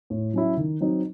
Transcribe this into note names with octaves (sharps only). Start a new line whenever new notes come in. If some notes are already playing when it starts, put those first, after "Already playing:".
A2
F#3 C#4 E4
D#3
F#3 C4 D#4